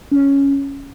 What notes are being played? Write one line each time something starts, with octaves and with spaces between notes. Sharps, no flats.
C#4